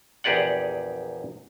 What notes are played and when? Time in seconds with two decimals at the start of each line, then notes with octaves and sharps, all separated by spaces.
0.24 A#1 E2 G4 G#4 D5 F#5